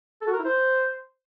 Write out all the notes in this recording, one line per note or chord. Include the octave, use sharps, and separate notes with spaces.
A4
F#4
A#4
E4
C5